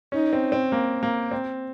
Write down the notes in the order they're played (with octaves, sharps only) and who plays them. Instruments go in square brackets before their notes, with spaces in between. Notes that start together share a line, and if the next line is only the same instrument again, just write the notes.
[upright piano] C#4 [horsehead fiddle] D#4
[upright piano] C4
C4
A#3
A#3
C4